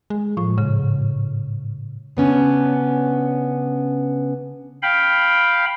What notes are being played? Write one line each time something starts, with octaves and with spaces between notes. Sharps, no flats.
G#3
A2 F3
G#2 C#3
C#3 B3 C#4 D4
F5 G5 B5